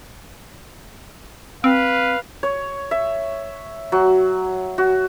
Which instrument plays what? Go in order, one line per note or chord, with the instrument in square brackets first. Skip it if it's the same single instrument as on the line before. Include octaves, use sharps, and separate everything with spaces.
[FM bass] C4 [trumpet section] B4 F5
[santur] C#5
E5
F#3
F#4